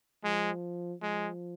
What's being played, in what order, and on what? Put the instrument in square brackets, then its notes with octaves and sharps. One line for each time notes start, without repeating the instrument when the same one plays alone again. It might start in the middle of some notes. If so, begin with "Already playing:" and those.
[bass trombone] F3 [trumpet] G#3
[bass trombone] F3 [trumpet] G#3